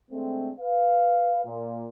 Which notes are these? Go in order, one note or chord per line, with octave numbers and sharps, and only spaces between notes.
D3 G#3 A3 C4
B4 F5
A#2